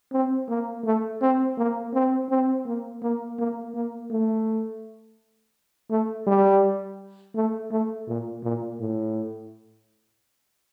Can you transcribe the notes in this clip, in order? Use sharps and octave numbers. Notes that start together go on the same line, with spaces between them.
C4
A#3
A3
C4
A#3
C4
C4
A#3
A#3
A#3
A#3
A3
A3
G3
A3
A3
A#2
A#2
A2